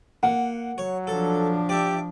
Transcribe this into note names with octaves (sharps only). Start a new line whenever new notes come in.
A#3 F#5
F#3 C#5
F3 D4 A4
G4 D5 E5